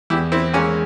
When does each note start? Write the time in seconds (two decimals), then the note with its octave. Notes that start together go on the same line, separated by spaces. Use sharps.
0.10 E2 E4 G4
0.32 C4 E4
0.53 G#3 A#3 C#4